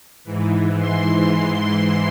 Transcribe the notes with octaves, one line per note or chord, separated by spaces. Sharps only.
G#2 E3
C6